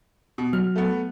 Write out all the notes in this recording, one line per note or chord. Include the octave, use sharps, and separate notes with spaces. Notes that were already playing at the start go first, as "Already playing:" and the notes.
B2
F#3 F6
A3 B3